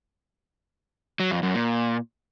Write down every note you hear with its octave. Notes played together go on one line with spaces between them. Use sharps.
F#3
F2
F#2
A#2